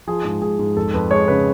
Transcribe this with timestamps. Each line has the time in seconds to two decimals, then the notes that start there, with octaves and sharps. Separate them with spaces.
0.07 F3 G#4
0.25 G#2
0.42 G#2 G#4
0.59 G#2
0.76 F2 A4
0.94 F2 B4
1.11 G#3 C#5
1.28 C#3 B4